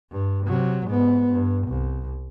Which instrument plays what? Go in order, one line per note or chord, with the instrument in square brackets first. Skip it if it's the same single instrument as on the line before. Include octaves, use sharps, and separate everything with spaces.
[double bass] G2
C3 F#3
G#2 B3
G2
C2